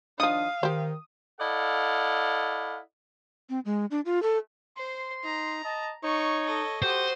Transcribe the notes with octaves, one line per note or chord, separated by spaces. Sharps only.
D#3 F3 D4 F5 D#6
D#3 G4 C5
E4 A4 D5 D#5 F5 F#5
C4
G#3
D4
F4
A4
C5 C6
D#4 A#5
D#5 A5
D#4 C#5 C#6
A4 D#5
F#4 G4 C5 D#6